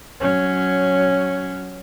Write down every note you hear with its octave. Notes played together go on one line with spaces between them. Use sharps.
F#3 C#4